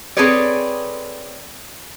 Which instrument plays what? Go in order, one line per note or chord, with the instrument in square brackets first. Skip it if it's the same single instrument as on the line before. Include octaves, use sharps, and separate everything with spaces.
[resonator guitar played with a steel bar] C4 G#4 A4 B4 C#5 D5